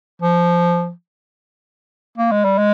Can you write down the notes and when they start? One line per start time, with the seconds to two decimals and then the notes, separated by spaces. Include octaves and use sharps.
0.22 F3
2.18 A#3
2.32 G#3
2.45 G3
2.58 G#3